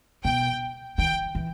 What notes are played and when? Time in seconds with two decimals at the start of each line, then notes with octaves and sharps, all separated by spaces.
0.25 B2 G5
0.98 D#3 G5
1.35 E3